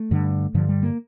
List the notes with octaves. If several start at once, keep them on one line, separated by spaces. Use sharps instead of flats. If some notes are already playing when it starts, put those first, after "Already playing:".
Already playing: A3
G2 D3
G2 D3 F3
G3
A#3